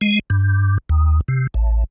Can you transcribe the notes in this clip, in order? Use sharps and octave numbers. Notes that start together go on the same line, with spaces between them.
G#3
G2
D#2
C3
A1